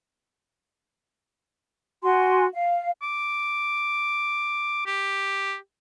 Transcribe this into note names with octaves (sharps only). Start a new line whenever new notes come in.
F#4 G#5 C6
F5
D6
G4